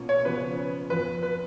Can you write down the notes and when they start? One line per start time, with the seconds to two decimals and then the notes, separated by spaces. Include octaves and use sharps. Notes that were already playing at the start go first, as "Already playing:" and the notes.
Already playing: B2 A#3 C#4 F4
0.09 C#5
0.25 C#3 F3 B3 F4 B4
0.90 F2 F3 B3 B4
1.23 B4